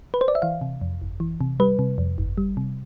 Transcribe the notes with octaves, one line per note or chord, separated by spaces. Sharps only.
B4
C5
D5
E5
E3 F5
C3
F2
G1
E3
C3
G3 B4
C3
F2
G1
G3
C3